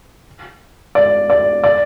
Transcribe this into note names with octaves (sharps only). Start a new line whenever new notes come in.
D5
D5
D5